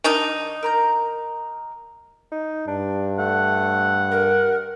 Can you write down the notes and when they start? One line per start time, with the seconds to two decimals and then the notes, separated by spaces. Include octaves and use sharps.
0.04 D#3 D4 D#4
0.63 A#4 A#5 G6
2.32 D#4
2.68 G2 D4
3.19 A3 F#5
4.11 A#4